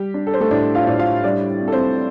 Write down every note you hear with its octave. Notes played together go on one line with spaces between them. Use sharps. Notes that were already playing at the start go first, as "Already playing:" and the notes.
Already playing: G3 G4
D4
A4
C5
A3 A4
A2 D4 D5
F4 F5
A2 D5
F4 F5
G3 D4 D5
C4
A4
C4 C5